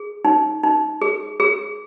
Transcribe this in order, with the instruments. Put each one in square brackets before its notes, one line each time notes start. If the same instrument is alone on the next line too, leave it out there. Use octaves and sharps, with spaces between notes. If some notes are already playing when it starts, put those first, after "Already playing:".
Already playing: [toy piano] G#4
D#4
D#4
G#4
G#4